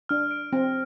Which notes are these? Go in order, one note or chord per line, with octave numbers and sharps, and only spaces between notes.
D4 F6
D7
C4 A#6